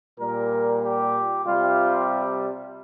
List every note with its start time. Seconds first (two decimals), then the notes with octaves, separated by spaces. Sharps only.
0.19 A#2 G3 A#4
0.83 G4
1.46 C3 G3 F4